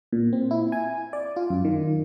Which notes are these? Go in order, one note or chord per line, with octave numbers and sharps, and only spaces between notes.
A#2
C4
E4
G#5
D5
F4
F#2
D#3